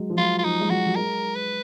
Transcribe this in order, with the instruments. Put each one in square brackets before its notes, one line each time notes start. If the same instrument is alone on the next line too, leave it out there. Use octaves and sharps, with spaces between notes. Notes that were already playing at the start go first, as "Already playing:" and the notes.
Already playing: [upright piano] F#3 G#3
F3
[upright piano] F#3 [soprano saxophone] F4
[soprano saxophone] F4
[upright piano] F3 [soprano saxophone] D#4
[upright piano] G#3
[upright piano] F#3 [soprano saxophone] F#4
[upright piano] F#3
[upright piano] G#3 [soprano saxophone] A#4
[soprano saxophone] B4